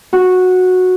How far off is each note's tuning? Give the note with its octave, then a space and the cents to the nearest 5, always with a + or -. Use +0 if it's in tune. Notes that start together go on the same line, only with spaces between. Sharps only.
F#4 -10